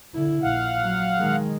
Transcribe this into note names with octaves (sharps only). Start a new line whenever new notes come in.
D3 E4
A#1 F5 F#5
F#3
D#3 G#3